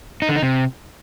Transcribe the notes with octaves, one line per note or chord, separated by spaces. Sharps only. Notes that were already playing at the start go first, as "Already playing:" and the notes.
D#4
D3
D#4
C3